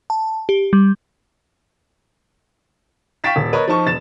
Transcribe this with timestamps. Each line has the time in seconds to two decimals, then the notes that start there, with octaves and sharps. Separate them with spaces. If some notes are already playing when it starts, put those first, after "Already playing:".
0.10 A5
0.49 G4
0.73 G3
3.24 F5 G5 C#6 A6 B6 E7
3.36 D#1
3.53 A#4 B4 C#5 D#5
3.68 F3 D#4 A5 C#6
3.86 E1 A6 E7